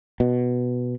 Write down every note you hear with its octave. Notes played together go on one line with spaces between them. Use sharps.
B2